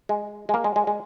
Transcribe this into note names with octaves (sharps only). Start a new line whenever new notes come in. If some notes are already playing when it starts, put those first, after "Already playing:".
G#3
G#3
A#3
G#3
G#3
G#3